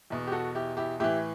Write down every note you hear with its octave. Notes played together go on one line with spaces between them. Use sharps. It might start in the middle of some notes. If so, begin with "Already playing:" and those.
E2 B2
G4
F#4 A4
E4 G4
E4 G4
A2 E3 E4 G4